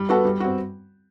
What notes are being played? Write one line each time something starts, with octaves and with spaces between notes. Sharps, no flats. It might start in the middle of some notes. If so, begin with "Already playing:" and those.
Already playing: G3
B3 F#4 A4
G3
C4 F#4